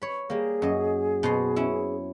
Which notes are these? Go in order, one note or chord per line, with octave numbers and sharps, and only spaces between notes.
C#5 B5
G3 A#3 G#4
F#2 D#5
B2 C5 C6
C#4 E4